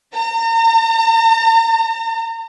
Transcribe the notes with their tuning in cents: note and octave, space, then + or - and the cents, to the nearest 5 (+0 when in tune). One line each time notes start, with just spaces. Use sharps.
A#5 -35